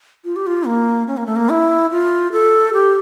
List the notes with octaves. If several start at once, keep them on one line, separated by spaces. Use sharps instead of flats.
F4
G4
F4
A#3
C#4
A#3
A3
A#3
E4
F4
A4
G4